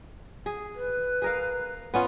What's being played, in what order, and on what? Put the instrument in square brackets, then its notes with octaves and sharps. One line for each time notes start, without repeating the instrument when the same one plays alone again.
[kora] G#4
[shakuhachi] B4
[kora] G#4 A#4 F5
B3 C#4 F4